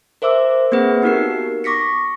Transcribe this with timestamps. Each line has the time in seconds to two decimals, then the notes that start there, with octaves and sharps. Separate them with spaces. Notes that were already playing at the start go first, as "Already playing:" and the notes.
0.22 A#4 C5 E5 D6 E6
0.72 A#3 C4 G#4 B4 F#5
1.02 B3 D#4 F#4 G4 A#4 C7
1.64 C#6 D6 A#6 B6 C#7